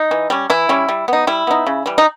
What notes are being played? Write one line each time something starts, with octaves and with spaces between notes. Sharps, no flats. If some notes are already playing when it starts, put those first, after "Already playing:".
Already playing: D#4
E3
G3 C#4
E3 E4
G3 C#4
G3
B3 D#4
G3 E4
B3 D#4
C#3
E3 G3
D#4